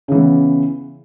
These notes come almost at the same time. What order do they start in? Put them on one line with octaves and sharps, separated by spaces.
C#3 E3 B3